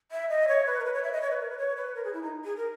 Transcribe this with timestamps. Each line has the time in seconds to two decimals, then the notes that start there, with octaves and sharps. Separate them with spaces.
0.12 E5
0.29 D#5
0.48 C#5
0.67 B4
0.80 A#4
0.85 B4
0.94 C#5
1.03 E5
1.12 D#5
1.22 C#5
1.31 B4
1.40 A#4
1.49 B4
1.58 C#5
1.77 B4
1.95 A#4
2.04 G#4
2.14 E4
2.22 D#4
2.44 G#4
2.57 A#4